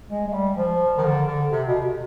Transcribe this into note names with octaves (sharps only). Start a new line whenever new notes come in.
G#3
G#3
G3
F3
D#3
D3
D3
C3
B2